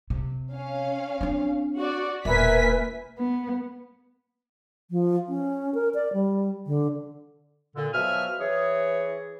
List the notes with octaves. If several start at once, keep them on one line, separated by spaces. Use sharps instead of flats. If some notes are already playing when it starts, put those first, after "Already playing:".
C3
C#4 F5
C4 D4
F#4 D5
E1 A#2 A#4 B4 E5 G#5 B6
B3
F3
C#4
A#4
D5
G3
D3
A#2 D3
B2 F3 F#3 E5 G#5 F6
E3 G#4 C#5